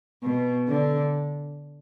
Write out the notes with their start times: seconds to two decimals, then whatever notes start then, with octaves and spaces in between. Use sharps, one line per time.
0.23 B2
0.68 D3